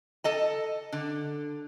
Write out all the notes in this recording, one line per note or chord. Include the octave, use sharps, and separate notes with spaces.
A4 D#5 A5
D3